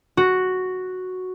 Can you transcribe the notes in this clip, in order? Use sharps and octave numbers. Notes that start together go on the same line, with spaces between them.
F#4